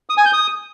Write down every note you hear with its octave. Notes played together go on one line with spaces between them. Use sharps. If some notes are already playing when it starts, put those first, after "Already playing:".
D#6
G#5
G6
D#6